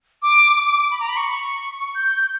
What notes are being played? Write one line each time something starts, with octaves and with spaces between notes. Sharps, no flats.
D6
D6
B5
A#5
B5
C#6
G6